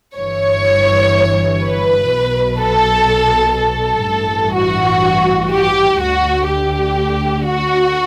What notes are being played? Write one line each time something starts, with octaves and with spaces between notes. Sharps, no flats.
G1 G2 E3 C#5
B4
B1 B2
A4
A4
A1 G2 E3
F#4
G4
D2 D3 F#4
G4
F#4